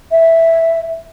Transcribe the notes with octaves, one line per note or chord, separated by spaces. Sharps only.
E5